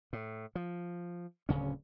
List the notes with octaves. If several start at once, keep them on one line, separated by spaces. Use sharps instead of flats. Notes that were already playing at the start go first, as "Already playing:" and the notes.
A2
F3
D1 D2 C#3 C#4